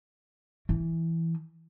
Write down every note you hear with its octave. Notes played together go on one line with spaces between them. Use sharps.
E3